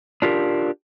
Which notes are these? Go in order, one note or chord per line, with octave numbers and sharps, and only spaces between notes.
D4 F4 G4 A#4